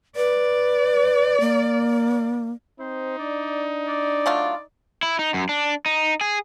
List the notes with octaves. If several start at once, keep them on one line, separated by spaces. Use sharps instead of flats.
B4 D5
A#3
C4 D#4 C5
D4 D5
D5
F#3 A3 F4
E4
D#4
F#2
D4
D#4
G#4